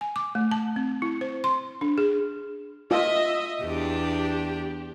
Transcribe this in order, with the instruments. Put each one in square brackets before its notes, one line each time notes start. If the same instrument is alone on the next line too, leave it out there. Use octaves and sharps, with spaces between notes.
[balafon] G#5
D6
A3
A5
C4
E4
C5
C6
D4
G#4
[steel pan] F4 [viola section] D#5 E5
[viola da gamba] E2 D4 [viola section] G4